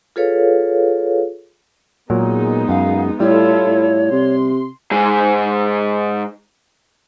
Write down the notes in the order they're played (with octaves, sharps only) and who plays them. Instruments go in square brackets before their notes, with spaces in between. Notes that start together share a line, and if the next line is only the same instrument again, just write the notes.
[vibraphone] F4 G#4 A4 B4 C#5 F5
[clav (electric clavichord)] A#2 F#3 A#4 [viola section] G#3 B3 D#4
[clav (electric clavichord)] F#2 [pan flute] F5
[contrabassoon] A2 [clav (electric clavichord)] G3 [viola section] E4 F4 A4 [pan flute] C#5
[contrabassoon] A2
[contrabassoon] C3 [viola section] C6
[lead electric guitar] G#2 G#4